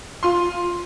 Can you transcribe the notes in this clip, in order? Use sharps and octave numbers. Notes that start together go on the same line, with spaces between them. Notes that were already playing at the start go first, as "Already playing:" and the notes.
F4 C6